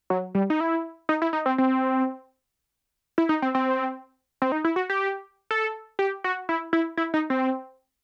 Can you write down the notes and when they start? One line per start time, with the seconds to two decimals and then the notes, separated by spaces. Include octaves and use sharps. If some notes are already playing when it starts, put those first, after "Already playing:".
0.10 F#3
0.35 G3
0.50 D#4
0.60 E4
1.09 D#4
1.22 E4
1.33 D#4
1.46 C4
1.58 C4
3.18 E4
3.29 D#4
3.42 C4
3.55 C4
4.42 C4
4.52 D#4
4.65 E4
4.76 F#4
4.90 G4
5.51 A4
5.99 G4
6.24 F#4
6.49 E4
6.73 E4
6.97 E4
7.14 D#4
7.30 C4